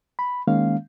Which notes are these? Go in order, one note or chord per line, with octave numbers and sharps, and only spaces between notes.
B5
D#3 G#3 A#3 C#4 F5